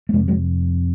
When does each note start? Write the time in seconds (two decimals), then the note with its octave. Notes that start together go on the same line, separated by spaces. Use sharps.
0.09 A3
0.13 F2 C3 G#3 A#3
0.28 F#3 G#3